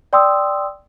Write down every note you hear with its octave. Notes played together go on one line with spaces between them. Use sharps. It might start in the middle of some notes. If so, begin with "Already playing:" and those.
D5 G5 C6 D#6 E6